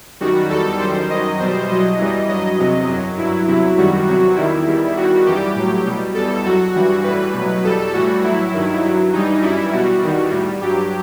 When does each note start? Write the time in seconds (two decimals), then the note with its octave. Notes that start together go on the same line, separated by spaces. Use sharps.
0.20 F#2 D#3 G3 F#4
0.50 E2 D#3 G3 A4
0.79 F#2 D#3 G3 C5
1.10 F#2 D#3 F#3 D#5
1.40 E2 B2 G3 C5
1.68 E2 B2 F#3 D#5
1.98 F#2 E3 G3
2.28 G2 F#3 D#5
2.58 E2 C3 F#3
2.89 F#2 F#3
3.18 G2 F#3 E4
3.47 E2 C3 F#3 E4
3.77 F#2 D#3 G3 F#4
4.07 E2 C3 F#3 F#4
4.36 E2 D#3 G3 E4
4.67 E2 D#3 G3
4.96 E2 D#3 G3 F#4
5.25 F#2 E3 G3 G4
5.55 A2 F#3
5.86 B2 G3
6.15 E2 B2 G3 A4
6.44 F#2 F#3 F#4
6.75 G2 E3 G3 F#4
7.04 A2 E3 G3 B4
7.34 B2 F#3
7.63 E2 B2 G3 A4
7.94 A2 E3 G3 F#4
8.23 A2 F#3 E4
8.53 G2 D#3 F#3
8.83 G2 F#3
9.13 G2 E3 G3 D#4
9.42 F#2 E3 G3 E4
9.73 B2 G3 F#4
10.02 E2 D#3 G3
10.31 A2 G3
10.62 G2 F#3 G4